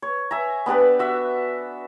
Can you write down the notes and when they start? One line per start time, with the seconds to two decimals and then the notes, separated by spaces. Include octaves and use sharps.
0.02 C#5
0.31 E5 G#5 A#5
0.66 B3 D4 G4 B4
0.99 F#4 E5